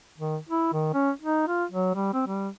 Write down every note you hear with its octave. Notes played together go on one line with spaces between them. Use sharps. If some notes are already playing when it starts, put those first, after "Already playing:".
D#3
E4
D#3
C#4
D#4
F4
F#3
G3
C4
G3